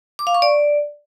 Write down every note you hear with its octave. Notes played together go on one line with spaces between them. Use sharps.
D6
F5
C#6
D5